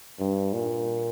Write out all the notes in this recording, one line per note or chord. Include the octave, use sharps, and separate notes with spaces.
G2
A#2